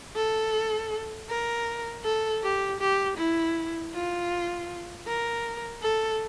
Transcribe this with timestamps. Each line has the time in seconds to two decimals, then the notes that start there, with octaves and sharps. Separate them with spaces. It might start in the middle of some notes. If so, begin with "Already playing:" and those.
0.16 A4
1.29 A#4
2.04 A4
2.43 G4
2.80 G4
3.17 E4
3.94 F4
5.07 A#4
5.83 A4